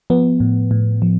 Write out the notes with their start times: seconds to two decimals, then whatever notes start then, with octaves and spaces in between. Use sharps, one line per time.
0.10 F3 B3
0.40 A2
0.71 A2
1.02 F3